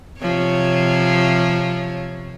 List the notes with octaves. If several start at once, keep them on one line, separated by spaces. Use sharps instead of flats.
C3 F3 C#5